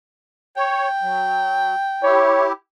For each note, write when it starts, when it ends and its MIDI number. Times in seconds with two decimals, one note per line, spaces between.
0.57 0.88 73
0.57 2.25 79
1.02 1.75 54
2.03 2.52 64
2.03 2.52 67
2.03 2.49 73